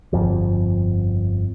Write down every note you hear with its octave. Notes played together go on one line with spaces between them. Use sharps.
G1 F2 F3